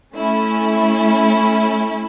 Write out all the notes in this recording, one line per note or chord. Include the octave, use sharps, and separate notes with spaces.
A3 C#4 E4